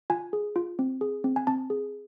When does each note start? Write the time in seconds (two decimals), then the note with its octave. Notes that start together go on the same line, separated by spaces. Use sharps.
0.10 F4 G#5
0.33 G#4
0.56 F4
0.79 C4
1.01 G#4
1.24 C4
1.36 G#5
1.47 C4 A5
1.70 G#4